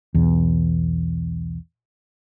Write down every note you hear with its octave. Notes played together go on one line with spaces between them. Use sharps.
B1 E2